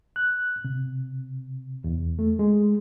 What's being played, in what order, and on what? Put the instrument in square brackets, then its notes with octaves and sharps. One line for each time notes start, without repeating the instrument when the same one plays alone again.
[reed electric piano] F#6
C3
E2
A3
G#3